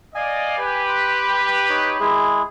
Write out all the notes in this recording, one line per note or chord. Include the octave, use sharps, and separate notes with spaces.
D5 D#5 F5 G#5
G4 B4
C6
D#4 C#5
G#3 E4 G#4